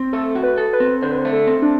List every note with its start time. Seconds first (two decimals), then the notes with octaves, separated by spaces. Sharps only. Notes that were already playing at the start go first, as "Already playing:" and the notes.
Already playing: C4
0.13 A3 A4
0.35 F#4
0.43 B4
0.58 A4
0.73 B4
0.80 C4
1.02 D3 C5
1.11 B4
1.18 C5
1.25 A3
1.33 A4
1.47 C4
1.62 D4